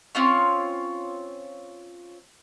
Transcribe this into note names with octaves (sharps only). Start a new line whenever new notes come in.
C4 C#4 F4 C#5